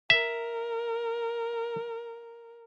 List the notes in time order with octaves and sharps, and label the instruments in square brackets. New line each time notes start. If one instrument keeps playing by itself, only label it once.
[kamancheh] A#4 [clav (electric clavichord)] E5